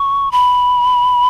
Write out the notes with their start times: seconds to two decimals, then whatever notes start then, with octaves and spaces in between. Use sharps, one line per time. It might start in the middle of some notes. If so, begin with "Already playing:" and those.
Already playing: C#6
0.32 B5